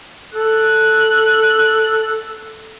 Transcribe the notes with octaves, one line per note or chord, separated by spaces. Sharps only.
A4 F#6